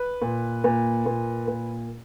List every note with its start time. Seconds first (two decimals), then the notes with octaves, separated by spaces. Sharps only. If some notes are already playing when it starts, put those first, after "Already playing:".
Already playing: B4
0.22 A#2
0.64 A#2
1.06 A#2
1.48 A#2